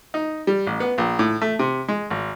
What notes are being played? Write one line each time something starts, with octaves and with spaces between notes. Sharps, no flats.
D#4
G3
A1
B3
A#1
A2
A3
C3
G#3
G#1